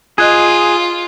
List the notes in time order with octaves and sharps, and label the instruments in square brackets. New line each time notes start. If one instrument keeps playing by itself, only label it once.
[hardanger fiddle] F4 [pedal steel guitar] G#4 [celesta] D#5 F#6 G#6